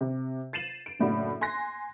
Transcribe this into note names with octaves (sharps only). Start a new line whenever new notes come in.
C3
A6 C7 D#7 E7 F#7
D7
F#1 A2 D4 F#4
G#5 C6 F#6 A#6